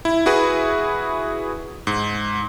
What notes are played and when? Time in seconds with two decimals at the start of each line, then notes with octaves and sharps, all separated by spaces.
0.05 E4
0.26 E4 F#4 G#4 B4
1.87 G#2